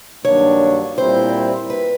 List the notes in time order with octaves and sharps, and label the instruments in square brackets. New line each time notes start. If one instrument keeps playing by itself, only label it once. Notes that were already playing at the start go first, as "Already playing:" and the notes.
[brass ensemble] G2 D#3 F#3 A#3 D4 [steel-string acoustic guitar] C#5
[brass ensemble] A#2 G3 C4 E4 [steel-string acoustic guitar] C5
[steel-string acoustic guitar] B4